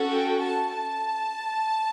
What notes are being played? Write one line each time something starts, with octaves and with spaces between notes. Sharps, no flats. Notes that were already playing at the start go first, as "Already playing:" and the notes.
Already playing: C#4 F#4 A4
G5
A5
A5